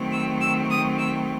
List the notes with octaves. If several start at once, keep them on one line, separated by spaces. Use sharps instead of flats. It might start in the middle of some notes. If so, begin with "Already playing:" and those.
Already playing: D#3 F#3 A3 C4
E6
E6
D#6
E6